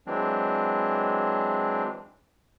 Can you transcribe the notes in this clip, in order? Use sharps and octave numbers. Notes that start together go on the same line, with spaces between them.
E3 F#3 G#3 C4 D4